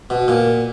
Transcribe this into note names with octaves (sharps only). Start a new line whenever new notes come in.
B2
A#2